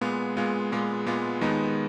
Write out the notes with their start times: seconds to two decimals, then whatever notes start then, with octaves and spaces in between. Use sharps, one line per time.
0.01 A#2 G#3 B3 F4
0.37 A#2 G#3 B3 F4
0.72 A#2 G#3 B3 F4
1.06 A#2 G#3 B3 F4
1.41 D#2 D#3 G#3 B3 D#4